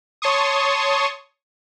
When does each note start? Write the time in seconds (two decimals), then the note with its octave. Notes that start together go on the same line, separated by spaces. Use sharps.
0.22 C#5 A5 C6 C#6 D#6